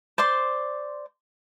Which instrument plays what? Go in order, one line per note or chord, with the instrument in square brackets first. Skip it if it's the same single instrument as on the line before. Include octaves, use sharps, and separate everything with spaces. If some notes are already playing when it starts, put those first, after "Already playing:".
[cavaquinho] C5 D5 C6